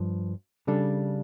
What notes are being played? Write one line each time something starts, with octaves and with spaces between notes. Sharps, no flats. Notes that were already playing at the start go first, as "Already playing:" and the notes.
Already playing: G2 F3
C#3 G3 D4 A4